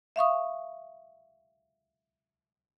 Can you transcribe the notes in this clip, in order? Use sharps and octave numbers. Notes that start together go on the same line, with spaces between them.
E5 F5 C#6 D#6